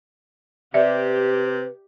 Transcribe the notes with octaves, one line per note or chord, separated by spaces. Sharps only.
C3 G4 B4 D5 E5